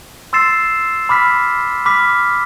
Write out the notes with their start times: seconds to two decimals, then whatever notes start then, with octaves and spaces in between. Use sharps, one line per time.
0.33 C6 E6 A6 C7 E7
1.09 B5 D6 F6 B6
1.85 B5 D6 F6 B6